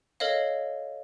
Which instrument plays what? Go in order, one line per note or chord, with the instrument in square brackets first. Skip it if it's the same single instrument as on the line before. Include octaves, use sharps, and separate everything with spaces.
[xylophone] A4 A#4 C#5 D#5 F5